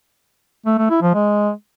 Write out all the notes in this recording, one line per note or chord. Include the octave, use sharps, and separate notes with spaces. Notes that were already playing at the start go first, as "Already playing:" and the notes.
A3
A3
E4
F3
G#3